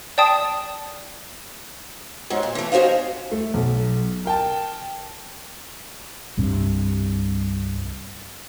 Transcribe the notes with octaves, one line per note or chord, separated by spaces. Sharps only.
D5 G5 A5 D#6
G#2 F#3
A#2
E3 A3
C#4 F#4 C5 D#5 F5
A3
B1
A#4 G5 A5
C2 G2 C3